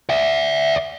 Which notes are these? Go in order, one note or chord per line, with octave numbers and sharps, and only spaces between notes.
D5 E5